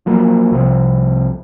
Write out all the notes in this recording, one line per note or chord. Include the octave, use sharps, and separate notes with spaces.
F3 F#3 A#3
C2 C3 F3